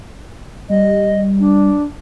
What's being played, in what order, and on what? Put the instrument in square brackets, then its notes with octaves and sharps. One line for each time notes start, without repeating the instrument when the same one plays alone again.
[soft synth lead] G3 [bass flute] D#5
[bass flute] D4